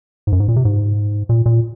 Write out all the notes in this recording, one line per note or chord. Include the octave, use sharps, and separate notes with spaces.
G#2
F#2
G#2
A#2
C3
G#2
A#2
A#2